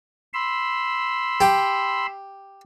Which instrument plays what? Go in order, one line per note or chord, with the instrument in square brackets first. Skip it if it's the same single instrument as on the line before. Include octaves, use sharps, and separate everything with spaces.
[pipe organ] B5 C6 E6
[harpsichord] G4